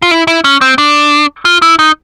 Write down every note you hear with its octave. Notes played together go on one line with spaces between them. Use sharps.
F4
E4
E4
C#4
C4
D4
F4
E4
D#4